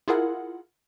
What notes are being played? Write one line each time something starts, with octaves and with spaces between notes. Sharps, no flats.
E4 F4 G#4 A#4 F#5